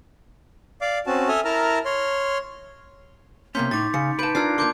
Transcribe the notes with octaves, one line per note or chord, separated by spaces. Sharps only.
D5 F5 D6
C4 C#4 F#4 A5
A4 E5 G#5 D#6 F6
E4 A#4 A5 A#5 F6
C#5 C6 F6
C3 A#3 B3 C#4 C6 G6 B6
A2 D#4 D6 A6
C#3 C#7
B4 A5 G6 D7
D4 F4 A#4 E6 G#6 C7
A#3 A#4 C6 D6 G6